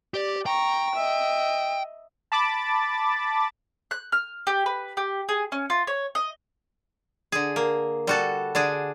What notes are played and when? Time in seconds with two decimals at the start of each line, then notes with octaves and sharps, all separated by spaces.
0.14 G4 D5
0.46 G5 A#5 C#6
0.95 D#5 E5
2.32 A5 B5 D6 A6
3.91 F#6
4.12 F6
4.47 G4
4.66 B4
4.97 G4
5.29 G#4
5.52 C#4
5.70 F4
5.87 C#5
6.15 D#5
7.32 D3 G#4
7.56 A#3
8.07 G3 F#4 A4
8.55 D3 D4 G#4